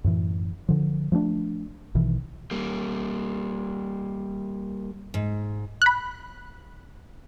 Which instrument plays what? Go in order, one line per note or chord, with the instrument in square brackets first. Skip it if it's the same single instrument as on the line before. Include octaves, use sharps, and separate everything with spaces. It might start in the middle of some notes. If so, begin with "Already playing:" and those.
[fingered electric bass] F#2 A2 E3
D3 F3
F3 A3 A#3 D4
A#1 B2 D#3 E3
[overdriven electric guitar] G3 A#3
[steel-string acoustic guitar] G#2
[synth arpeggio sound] B5 F#6